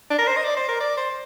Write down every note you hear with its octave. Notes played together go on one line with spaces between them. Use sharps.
D4
A#4
C5
D#5
D5
C5
A#4
D5
C5